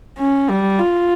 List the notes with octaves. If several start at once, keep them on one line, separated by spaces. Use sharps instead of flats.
C#4
G3
F4